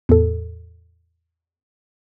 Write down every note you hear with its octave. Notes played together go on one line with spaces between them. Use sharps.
E2 A2 A4